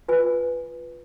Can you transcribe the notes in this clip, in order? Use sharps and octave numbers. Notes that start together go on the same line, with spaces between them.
F4 B4 G#5